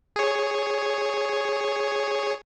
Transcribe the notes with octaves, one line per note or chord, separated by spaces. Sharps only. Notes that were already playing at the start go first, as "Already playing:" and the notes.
G#4 C#5